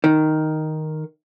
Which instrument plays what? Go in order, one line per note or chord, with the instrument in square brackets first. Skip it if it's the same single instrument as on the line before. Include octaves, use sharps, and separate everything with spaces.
[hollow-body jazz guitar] D#3